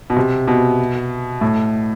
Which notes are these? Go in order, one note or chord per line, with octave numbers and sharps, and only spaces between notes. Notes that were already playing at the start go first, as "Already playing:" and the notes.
B2
C3
B2
A2